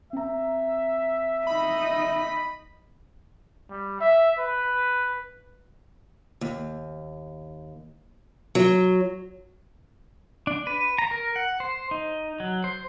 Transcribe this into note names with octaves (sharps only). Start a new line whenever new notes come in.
C4 E5 A#5
D#4 D#5 B5
G3
E5
B4
D#2
F#3
D4
B4
A#5
A#4
F#5
C5
D#4
F#3
C5